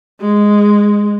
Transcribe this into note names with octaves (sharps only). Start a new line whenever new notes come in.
G#3